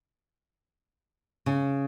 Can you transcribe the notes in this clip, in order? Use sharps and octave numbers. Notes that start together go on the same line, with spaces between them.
C#3